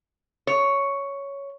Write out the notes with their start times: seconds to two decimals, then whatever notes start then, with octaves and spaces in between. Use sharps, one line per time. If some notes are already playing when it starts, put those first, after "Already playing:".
0.47 C#5